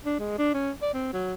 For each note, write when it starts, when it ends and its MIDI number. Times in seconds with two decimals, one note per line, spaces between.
0.05 0.17 62
0.19 0.34 56
0.38 0.52 62
0.54 0.71 61
0.82 0.90 74
0.94 1.10 60
1.13 1.34 54